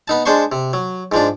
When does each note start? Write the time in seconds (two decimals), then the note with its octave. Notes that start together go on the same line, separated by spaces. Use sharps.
0.08 B3 D#4 A5
0.25 G#3 D4 C5 A5 C6 C#6
0.52 C3
0.73 F#3
1.12 G#2 F3 D4